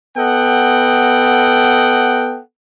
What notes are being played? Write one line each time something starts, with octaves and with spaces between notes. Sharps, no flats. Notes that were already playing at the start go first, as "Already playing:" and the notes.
B3 A4 D#5 F#5 G5